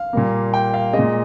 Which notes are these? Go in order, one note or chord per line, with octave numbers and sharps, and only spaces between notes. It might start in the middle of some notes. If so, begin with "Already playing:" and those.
Already playing: F5
A#2 G3 A#3
G5
F5
G#3 D#5
A#2